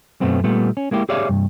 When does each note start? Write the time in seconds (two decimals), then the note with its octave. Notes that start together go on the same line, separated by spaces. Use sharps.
0.21 F#2 B2 A3 B3 C4
0.44 A#2 G3 A3 B3
0.77 C#4
0.91 G#3 A#3 E4 G4
1.09 G4 G#4 C#5 D5 E5 F5
1.29 C2 G2